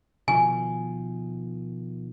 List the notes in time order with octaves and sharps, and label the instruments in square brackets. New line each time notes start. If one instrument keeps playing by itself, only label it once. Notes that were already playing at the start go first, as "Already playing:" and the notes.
[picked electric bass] B2 D#3 F3 [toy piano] G#5